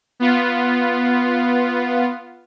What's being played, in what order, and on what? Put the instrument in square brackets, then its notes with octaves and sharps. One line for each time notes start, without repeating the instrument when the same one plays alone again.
[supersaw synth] B3 F4